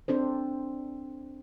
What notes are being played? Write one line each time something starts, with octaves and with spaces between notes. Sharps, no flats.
C4 D4 A4 C5